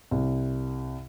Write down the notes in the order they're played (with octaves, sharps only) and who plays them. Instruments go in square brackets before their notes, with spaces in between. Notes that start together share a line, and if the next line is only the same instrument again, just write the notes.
[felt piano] C2